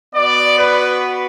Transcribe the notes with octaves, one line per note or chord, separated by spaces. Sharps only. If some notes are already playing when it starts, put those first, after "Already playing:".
B3 F#4 D5
B4